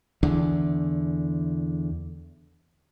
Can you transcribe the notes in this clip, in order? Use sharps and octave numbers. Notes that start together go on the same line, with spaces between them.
E2 D3